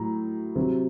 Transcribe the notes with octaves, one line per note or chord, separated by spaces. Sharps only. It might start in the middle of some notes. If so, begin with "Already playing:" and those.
Already playing: A2 F#3 A#5
C3 F#3 C4